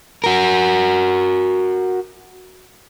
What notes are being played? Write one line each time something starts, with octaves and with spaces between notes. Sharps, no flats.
F#4 A#4